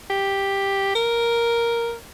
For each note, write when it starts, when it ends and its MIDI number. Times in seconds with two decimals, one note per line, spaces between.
0.10 0.92 67
0.95 1.95 70